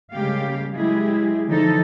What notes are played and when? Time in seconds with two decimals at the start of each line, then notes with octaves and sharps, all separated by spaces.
0.13 C#3 G3 G#3 A#3 G4 F5
0.75 F#3 G#3 E4 G4 G#4
1.48 D3 E3 F3 D#4 A4